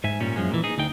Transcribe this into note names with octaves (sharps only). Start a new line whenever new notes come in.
G#2 G#3 E5 G#5
A#2 G3 C#4
F#2 F3 G#3
A#2 E3
D#4 G#4
D2 D#4 G5